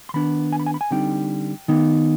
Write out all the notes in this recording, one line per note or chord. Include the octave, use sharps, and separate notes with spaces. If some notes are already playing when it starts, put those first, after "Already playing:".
C6
D#3 B3 D4 B5
G#5
B5
G#5
B5
G#5
D3 G3 C4 D#4 G5
D#3 B3 D#4